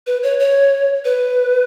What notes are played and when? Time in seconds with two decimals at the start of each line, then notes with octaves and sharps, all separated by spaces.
0.07 B4
0.23 C#5
0.40 C#5
1.05 B4